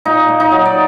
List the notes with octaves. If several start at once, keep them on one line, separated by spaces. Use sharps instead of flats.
A#2 D#4
A#3
D#4
F#3
D5